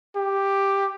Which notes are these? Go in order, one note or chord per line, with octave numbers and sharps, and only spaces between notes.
G4